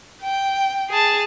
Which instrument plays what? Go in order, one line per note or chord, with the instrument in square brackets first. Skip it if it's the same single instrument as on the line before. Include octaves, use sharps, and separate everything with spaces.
[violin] G5
G#4 A5